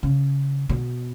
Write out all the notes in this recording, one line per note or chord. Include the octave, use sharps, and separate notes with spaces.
C#3
B2